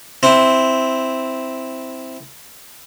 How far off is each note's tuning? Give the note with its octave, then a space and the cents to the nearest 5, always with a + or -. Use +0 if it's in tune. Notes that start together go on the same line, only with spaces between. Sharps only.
C4 +0 E4 +0